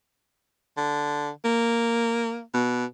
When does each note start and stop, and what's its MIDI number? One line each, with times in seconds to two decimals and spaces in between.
0.77 1.30 50
1.45 2.41 58
2.54 2.85 47